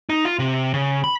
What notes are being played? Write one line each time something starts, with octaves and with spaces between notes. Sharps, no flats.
D#4
F4
C3
C#3
B5